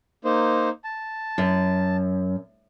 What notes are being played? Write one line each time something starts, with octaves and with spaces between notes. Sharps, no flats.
A#3 D#4 C5
A5
F#2